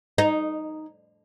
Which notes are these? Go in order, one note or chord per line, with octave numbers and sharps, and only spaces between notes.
D#4